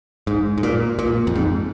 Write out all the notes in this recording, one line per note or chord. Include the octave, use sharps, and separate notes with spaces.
G#2
G#2
A#2
A#2
F2
G#2